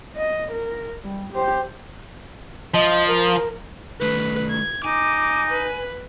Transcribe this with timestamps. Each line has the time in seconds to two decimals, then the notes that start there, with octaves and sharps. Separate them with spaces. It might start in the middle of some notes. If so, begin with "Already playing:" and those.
0.16 D#5
0.52 A#4
1.04 G3
1.33 G4 C5
2.74 F3 D#5
3.08 A#4
4.01 D#3 A3 B4
4.51 G#6
4.84 D#4 G#5 D6
5.51 B4